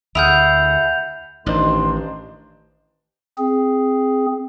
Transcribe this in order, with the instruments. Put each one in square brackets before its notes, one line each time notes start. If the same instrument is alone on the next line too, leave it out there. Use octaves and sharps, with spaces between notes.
[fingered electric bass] D2 [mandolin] E4 G#4 [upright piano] E5 F#5 F6 [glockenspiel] G6 F7
[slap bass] A1 [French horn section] G2 D#3 [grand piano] D4 D#4 C5 [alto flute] C6
[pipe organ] C4 G#4